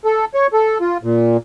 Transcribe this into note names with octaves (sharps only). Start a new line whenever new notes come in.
A4
C#5
A4
F4
A#2